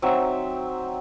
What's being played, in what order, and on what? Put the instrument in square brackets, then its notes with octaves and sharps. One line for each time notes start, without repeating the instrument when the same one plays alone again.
[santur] F#3 C4 D#4 E5